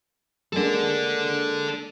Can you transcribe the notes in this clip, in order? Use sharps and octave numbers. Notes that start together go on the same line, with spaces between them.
G#3 A#3 D4 A4 D5